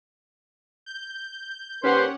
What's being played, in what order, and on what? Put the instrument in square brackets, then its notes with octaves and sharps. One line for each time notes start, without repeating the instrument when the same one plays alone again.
[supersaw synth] G6
[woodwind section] D#2 B4 C5 [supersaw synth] C#4 G4 F#5